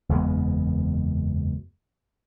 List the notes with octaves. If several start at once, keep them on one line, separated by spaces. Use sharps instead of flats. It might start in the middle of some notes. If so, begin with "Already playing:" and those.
F#1 E2 G#3 B3